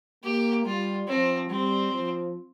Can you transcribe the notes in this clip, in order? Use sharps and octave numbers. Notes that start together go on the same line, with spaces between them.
A#3 G4
G3 F4
F3 C4
G3 C4
F3